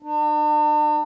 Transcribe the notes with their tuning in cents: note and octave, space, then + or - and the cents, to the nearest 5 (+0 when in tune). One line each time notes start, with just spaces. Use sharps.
D4 +45